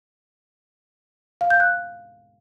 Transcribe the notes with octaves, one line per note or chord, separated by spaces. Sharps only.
F5
G6
F#6